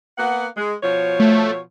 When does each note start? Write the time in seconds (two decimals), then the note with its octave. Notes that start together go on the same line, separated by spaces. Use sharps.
0.18 A#3 B3 F#5
0.57 G#3
0.83 B2 F3 C#5
1.20 A3